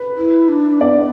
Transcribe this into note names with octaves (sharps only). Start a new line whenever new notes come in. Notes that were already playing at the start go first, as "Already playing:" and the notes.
Already playing: B4
E4
D4
B3 D5